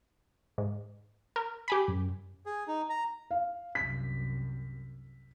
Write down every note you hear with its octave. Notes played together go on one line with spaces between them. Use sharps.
G#2
A#4
G4 G#5 B5
F#2
G#4
D#4
A#5
F5
C2 F#2 B6